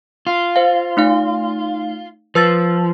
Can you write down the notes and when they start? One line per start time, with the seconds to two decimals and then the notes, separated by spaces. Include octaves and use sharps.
0.27 F4
0.56 C5 F5
0.97 A3 D#4 F5
2.35 F3 B4 E6 A6